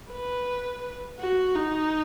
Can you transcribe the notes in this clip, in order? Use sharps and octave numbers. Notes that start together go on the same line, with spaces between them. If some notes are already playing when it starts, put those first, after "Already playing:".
B4
F#4
D#4